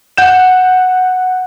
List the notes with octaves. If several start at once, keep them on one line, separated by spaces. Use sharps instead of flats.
F#5 G6 E7